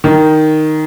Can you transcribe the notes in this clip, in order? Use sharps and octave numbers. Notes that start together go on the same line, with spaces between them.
D#3